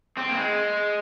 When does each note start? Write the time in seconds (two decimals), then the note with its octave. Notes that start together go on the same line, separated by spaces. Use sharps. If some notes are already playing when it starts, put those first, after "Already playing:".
0.18 C4
0.30 A#3
0.37 G#3